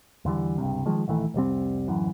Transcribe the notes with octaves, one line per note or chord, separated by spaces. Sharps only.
E2 D3 E3 G3
C#2 G2 C3
D#3 F3 G#3
A#1 D#3 E3 A3
F1 C2 G3 C4
D1 C2 F#2 E3